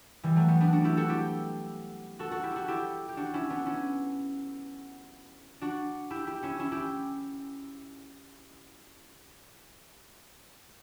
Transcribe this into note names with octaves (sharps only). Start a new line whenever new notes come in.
E3 G3
F#3 A3
G3 B3
B3 D4
D4 F#4
E4 G4
F#4 A4
E4 G4
F#4 A4
F#4 A4
E4 G4
F#4 A4
E4 G4
G4
D4 F#4
C#4 E4
B3 D4
C#4 E4
D4 F#4
E4 G4
E4 G4
C#4 E4
C#4 E4
E4 G4